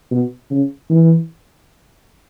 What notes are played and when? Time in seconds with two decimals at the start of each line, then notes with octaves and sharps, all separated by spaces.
0.11 B2
0.51 C#3
0.90 E3